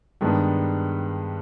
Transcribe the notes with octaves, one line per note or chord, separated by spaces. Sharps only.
G2 D#3 G#3 B3 D4